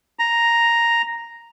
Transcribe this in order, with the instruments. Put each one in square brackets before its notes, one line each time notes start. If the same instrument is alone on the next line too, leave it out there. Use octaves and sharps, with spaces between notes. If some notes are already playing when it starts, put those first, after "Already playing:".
[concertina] A#5